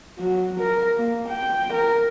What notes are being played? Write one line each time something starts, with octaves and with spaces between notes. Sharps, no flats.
F#3
A#4
A#3
G5
A#4